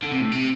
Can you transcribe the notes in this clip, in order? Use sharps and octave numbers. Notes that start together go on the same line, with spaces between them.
D3
C3
A2
C3